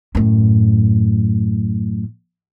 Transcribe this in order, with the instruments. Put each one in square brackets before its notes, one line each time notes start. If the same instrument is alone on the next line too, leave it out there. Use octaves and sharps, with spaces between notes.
[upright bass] F#2 A2